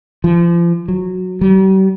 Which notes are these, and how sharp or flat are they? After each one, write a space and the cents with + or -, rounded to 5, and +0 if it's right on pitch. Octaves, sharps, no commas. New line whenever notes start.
F3 -35
F#3 -10
G3 -45